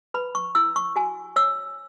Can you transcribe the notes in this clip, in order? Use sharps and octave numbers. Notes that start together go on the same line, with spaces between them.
B4 B5
C#6
E4 E6
C#6
F#4 G#5
C#5 E6